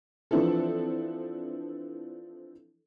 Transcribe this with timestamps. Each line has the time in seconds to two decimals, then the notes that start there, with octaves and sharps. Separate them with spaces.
0.31 E3 F3 C4 D4 E4 A4